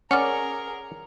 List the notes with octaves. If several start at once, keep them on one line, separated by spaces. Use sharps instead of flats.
C#4 G#4 A#4 D5 F#5 F6